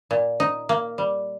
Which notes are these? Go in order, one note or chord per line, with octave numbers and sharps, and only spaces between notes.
A#2
D#4
A#3
G3